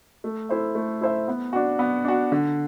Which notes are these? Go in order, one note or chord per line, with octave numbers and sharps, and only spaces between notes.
A3
E4 A4 C5 E5
A3
E4 A4 C5 E5
B3
D4 F#4
B3
D4 F#4
D3